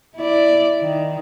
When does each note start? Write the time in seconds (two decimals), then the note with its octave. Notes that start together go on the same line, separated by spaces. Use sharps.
0.17 E4 D5
0.82 D#3